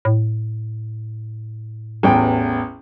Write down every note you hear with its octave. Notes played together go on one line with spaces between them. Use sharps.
A2
A1 E2 G5